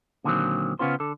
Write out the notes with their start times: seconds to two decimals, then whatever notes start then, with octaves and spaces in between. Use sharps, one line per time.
0.24 A#2 D3 D#3 F3 F#3 C4
0.79 C#3 B3 C#4 F4 C5
1.00 D3 A4